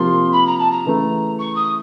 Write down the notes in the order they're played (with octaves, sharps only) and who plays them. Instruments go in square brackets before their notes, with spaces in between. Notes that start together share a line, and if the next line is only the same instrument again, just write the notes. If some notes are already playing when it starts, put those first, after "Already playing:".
Already playing: [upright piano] C3 F3 A#3 [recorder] C6
[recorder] B5
A#5
A5
A#5
[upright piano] C#3 E3 A3
[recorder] C#6
D#6